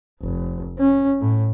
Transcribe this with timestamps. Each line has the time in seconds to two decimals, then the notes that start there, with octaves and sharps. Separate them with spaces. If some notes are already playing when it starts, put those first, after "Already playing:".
0.22 F1
0.79 C#4
1.21 A2